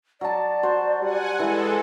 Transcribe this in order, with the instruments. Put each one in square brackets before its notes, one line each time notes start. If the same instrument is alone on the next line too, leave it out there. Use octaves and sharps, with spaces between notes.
[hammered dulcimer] F#3 A5 [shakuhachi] D5
[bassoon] F#4 [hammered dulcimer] C5
[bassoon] G3 [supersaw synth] F#5 G#5
[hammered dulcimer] E3 [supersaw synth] G#3 A4